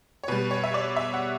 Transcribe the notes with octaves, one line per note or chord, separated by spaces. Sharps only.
C#5
B2 G3 B4
C#5
E5
D5
E5
F#5